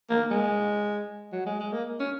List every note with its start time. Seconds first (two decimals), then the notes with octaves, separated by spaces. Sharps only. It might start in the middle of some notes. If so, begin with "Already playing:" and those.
0.09 A#3
0.31 G#3
1.32 F#3
1.46 G#3
1.60 G#3
1.72 A#3
2.00 C#4